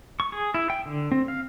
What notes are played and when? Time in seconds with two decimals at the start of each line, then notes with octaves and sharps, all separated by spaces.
0.20 C#6
0.32 G#4
0.54 E4
0.70 G5
0.86 D3
1.12 C4
1.28 F5